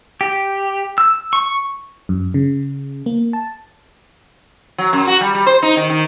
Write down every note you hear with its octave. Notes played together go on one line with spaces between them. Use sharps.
G4
E6
C#6
F#2
C#3
A#3
A5
F#3
F#2
F#4
G3
G3
C5
D#4
D#3
D#3